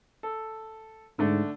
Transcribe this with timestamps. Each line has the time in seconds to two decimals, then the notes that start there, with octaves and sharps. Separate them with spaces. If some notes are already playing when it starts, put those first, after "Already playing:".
0.23 A4
1.19 G#2 D3 A3 D4